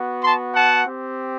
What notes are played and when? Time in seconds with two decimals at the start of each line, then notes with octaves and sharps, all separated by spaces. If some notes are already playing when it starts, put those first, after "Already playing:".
Already playing: B3 F#4
0.24 A5 C6
0.54 F#5 A5
0.86 C4 G4